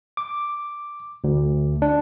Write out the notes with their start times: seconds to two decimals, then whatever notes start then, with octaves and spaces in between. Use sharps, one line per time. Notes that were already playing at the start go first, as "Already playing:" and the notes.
0.17 D6
1.24 D2
1.82 D4